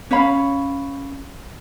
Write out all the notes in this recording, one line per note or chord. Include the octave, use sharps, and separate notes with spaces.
C#4 C#5 F5 B5